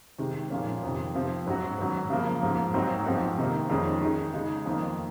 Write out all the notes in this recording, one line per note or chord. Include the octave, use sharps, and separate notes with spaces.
C3 D#3 G#3
A#2 F3 A#3 C#4
F2 C3 D#3
C3 F3 C4
G#2 F#3 C#4 F#4
G#2 D#3 F#3
C#3 F3 A#3
G#2 F3 A#3
G#2 F#3 C4 D#4 F#4
G#2 F3 C4 F#4
C3 D#3 A#3 D#4
F2 D#3 G#3 C#4
D#3 G#3 D#4 G#4
C#3 G#3 D#4 G#4
F2 D#3 A#3